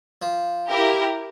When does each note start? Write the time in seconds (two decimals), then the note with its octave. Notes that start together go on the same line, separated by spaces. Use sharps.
0.22 F3
0.69 E4 G4 A#4